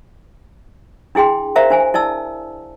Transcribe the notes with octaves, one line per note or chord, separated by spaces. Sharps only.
D4 E4 G#4 G5 C6
A#4 C5 E5 F5 A#5
D4 C5 G#5
E4 D5 A5 E6